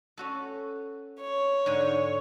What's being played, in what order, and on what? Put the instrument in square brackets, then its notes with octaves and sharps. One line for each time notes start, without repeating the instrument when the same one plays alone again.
[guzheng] C#4 F#4 A4
[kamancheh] C#5
[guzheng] G#2 D3 G#5